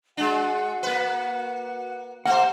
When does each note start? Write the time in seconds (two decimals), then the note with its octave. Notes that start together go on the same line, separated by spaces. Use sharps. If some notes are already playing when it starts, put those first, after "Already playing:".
0.17 G#3 D4 F#4 F#5
0.83 A#3 B4
2.25 A3 G4 C5 F#5